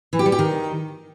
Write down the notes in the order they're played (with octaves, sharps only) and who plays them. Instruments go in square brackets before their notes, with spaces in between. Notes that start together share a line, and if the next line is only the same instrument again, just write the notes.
[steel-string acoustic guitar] E3
G4
G3
G4
D#3